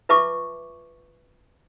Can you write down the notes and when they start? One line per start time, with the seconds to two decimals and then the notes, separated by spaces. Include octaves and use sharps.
0.09 F4 B4 E5 A5 C#6 D6